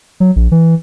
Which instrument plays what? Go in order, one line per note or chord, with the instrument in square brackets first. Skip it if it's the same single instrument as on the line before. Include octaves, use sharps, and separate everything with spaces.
[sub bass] F#3
A#1
E3